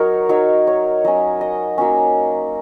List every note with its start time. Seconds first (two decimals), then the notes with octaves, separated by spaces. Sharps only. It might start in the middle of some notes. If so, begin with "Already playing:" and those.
Already playing: F#3 D#4 A#4 C#5
0.29 F#3 D#4 C#5
0.67 C#5
1.05 F#3 C#4 D#5
1.41 D#5
1.78 F#3 A#3 C#4